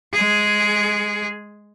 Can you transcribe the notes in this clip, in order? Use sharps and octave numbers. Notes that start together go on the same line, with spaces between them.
G#3 G#4